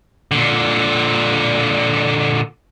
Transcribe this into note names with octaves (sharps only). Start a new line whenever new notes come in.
A#2 D3